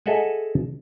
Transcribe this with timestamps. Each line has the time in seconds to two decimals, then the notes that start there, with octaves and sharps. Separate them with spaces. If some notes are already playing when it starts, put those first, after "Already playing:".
0.06 G#4 A4 D#5 E5 F#5 G#5